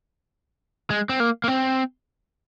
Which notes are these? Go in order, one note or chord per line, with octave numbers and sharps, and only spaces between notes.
G#3
C4
A#3
A#3
C4